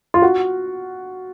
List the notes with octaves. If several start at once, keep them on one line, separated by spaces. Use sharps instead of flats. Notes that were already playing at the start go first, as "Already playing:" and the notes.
F4
F#4